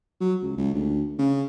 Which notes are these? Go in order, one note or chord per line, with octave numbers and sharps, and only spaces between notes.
F#3
C#2
C#2
D2
C#3